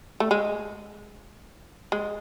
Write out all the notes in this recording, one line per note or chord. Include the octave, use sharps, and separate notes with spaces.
A3
G#3
G#3